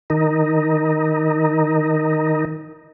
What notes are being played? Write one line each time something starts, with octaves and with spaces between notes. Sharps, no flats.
D#3 D#4